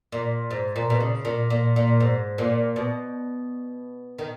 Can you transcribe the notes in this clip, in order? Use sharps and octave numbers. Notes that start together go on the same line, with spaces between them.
A#2
G#2
A#2
B2
C#3
A#2
A#2
A#2
G#2
A#2
B2
D#3